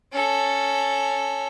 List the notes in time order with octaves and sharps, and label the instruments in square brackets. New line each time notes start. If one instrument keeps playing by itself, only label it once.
[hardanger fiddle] C#4 A4